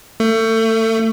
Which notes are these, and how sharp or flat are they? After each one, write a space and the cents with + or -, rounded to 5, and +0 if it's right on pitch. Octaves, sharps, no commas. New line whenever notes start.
A3 +30